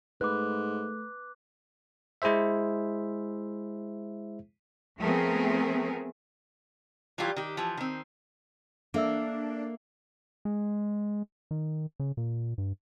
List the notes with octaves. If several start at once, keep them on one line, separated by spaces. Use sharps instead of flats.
G#2 A3 B4 D6 F#6
G#3 E4 G#4 C5 E5
F3 A3 B3 C4 G#4 A#4
E3 F#3 G3 F4 G4
D#3 G4
E3 F3
D#3 C4
A#3 D4 A4 E5 E6
G#3
D#3
C#3
A#2
G2